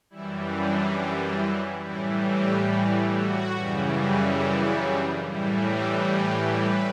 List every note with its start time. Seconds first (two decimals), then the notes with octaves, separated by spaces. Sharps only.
0.10 F#2 E3 G3 E4
0.54 D4
1.40 E4
1.83 A2 E3 G3 E4
2.26 G4
3.13 F#4
3.56 F#2 C#3 E3 G3
4.42 E4
4.86 D4
5.28 A2 E3 G3 E4
5.71 G4
6.14 B4
6.57 B4